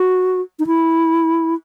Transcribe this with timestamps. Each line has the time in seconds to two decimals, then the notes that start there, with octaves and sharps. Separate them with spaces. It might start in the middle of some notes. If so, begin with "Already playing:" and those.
Already playing: F#4
0.59 D#4
0.67 E4